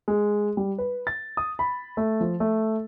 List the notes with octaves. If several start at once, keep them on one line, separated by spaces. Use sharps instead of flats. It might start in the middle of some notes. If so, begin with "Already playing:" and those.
G#3
G3
B4
A6
D#6
B5
A3
F3
A3